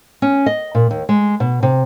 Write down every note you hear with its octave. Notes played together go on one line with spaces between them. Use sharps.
C#4
D#5
A#2
D#2
G#3
B2
C3